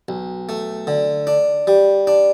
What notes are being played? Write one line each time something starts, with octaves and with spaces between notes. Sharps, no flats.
B1
A3
D3
D4
G3
D4